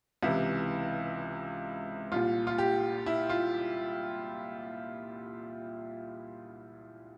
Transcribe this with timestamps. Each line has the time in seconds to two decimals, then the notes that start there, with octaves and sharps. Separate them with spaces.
0.23 C#2 C3 E3 E4
2.12 C2 A#2 F4
2.47 F4
2.58 G4
3.06 E4
3.29 F4